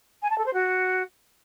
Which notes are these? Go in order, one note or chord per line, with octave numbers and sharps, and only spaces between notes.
G#5
A5
A4
C5
F#4